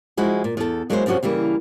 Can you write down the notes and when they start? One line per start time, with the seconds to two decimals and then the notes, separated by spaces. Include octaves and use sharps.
0.17 F3 G#3 E4 F#4
0.44 A#2
0.57 E2 A4
0.90 F#3 G#3 A#3 E4 B4 C5
1.06 F#2 C3 F3 C#4 F#4
1.23 C#3 E3 G3 A#3